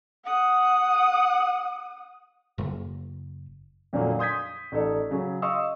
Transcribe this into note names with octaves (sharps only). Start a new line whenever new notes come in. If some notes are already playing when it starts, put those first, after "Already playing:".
F#5 D#6
F#1
F2 A#2 D3 F#3 A#3
C6 D#6 G6 G#6 B6
A1 D#4 A4 D5
C#3 F#3
D#5 F5 C6 C#6 D#6 E6